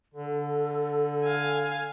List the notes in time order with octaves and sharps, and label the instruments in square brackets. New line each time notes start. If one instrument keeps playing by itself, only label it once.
[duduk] D3 [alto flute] A4
[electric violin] F5 G#5